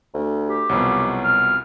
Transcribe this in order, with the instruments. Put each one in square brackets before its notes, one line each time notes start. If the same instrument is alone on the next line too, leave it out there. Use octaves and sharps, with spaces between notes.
[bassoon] D2
[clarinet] G4
[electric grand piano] C2 F2 B2 [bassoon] F#3
[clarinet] F6